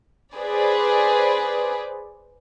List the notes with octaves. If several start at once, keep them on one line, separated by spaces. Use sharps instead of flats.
G#4 B4 C5 D5